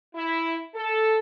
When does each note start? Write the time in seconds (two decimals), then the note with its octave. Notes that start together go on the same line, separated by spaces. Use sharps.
0.15 E4
0.75 A4